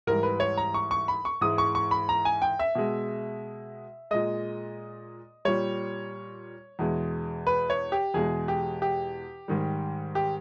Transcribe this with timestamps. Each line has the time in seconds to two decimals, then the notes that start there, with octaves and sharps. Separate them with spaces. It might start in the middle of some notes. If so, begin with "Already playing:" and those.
0.07 G#2 E3 G3 A#4
0.23 B4
0.40 C#5
0.57 A#5
0.74 C#6
0.91 C#6
1.08 B5
1.25 C#6
1.41 G#2 E3 G#3 D#6
1.58 C#6
1.75 C#6
1.91 B5
2.09 A#5
2.25 G#5
2.42 G5
2.59 E5
2.75 B2 G#3
4.11 A#2 G#3 D#5
5.45 A#2 G3 C#5
6.79 E2 B2 G#3
7.47 B4
7.70 C#5
7.92 G4
8.14 E2 B2 G#3 G#4
8.48 G4
8.82 G4
9.48 G#2 D#3 G3
10.15 G4